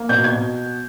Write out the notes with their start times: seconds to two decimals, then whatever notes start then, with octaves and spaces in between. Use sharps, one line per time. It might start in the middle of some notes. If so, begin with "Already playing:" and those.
Already playing: A#3
0.09 B2 G6
0.24 G#6
0.32 B2